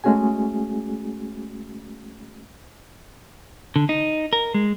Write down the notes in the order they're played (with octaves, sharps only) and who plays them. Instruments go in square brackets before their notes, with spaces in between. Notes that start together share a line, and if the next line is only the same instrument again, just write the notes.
[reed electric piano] G#3 A3 C#4 F#4 G#4 G#5
[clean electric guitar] D3
D#4
A#4
G#3